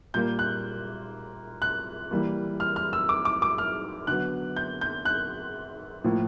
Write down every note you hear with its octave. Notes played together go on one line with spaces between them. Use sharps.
A#2 G3 A#3 G6
F#6
F#6
E3 G3 A#3
F6
F6
E6
D6
D6
D6
F6
D3 F#3 B3 F#6
G6
G6
F#6
A2 F3 A#3